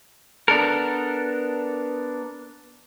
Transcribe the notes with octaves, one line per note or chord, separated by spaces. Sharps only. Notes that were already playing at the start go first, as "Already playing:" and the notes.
B3 D4 A4 A#4